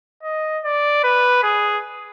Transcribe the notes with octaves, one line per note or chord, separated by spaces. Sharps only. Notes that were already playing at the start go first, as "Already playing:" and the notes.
D#5
D5
B4
G#4